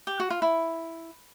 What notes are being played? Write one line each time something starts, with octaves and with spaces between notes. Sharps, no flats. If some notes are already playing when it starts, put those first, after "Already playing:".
G4
F#4
F4
E4